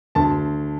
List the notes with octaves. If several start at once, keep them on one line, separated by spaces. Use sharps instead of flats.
D2 A5